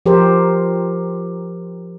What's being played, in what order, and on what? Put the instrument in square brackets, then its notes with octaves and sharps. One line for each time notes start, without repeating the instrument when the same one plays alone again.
[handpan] F3 G4 A#4 C5